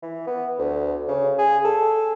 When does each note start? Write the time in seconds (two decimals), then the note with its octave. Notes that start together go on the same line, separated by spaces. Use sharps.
0.02 E3
0.27 B3
0.59 D2
1.08 C#3
1.38 G#4
1.65 A4